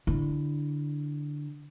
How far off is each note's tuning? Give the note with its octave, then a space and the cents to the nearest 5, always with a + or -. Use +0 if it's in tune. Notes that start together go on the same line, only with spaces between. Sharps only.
D3 +0 E4 +0